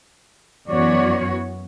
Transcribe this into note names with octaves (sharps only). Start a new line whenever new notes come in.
F#2 E3 B3 F#4 C#5 D5